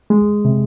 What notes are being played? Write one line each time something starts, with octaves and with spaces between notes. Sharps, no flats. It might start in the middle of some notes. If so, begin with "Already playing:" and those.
G#3
C3